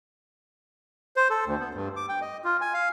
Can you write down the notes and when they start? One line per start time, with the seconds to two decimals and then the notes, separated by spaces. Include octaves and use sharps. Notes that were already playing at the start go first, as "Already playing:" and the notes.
1.16 C5
1.30 A4
1.46 D2
1.59 B3
1.75 G2
1.96 D6
2.09 G5
2.21 D#5
2.44 F4
2.61 G#5
2.74 F5